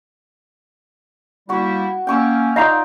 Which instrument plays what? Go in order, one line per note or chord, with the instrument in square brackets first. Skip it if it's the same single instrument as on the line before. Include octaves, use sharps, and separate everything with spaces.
[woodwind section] G3 A#3 E4 [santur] F#4 C#6
[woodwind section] A#3 C#4 [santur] G5 C#6 E6
[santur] D#4 F4 D5 [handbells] D#5 F5 A#5